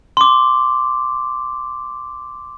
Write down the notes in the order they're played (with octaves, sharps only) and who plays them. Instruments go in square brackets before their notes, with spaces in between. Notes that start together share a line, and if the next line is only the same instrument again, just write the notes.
[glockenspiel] C6 D6